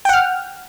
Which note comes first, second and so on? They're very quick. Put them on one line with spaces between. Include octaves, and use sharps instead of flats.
G5 F#5 F6